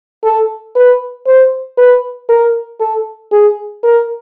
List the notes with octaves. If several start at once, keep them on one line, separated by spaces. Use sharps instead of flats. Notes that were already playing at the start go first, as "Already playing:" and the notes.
A4
B4
C5
B4
A#4
A4
G#4
A#4